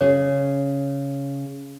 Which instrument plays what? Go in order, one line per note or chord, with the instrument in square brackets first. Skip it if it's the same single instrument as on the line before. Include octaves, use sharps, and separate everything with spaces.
[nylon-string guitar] C#3 G#4 [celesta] C#5